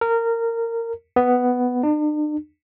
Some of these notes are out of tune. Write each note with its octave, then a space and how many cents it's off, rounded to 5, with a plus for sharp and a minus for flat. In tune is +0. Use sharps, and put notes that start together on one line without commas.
A#4 -20
B3 +5
D4 +45